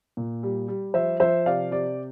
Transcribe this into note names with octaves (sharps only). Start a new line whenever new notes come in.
A#2
G3
G3
F3 C5 E5
F3 C5 E5
C3 D5 F5
C3 D5